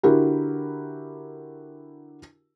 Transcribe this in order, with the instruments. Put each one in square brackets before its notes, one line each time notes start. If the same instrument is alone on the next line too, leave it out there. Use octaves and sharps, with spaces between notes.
[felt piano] D3 E4 F#4 G4 A#4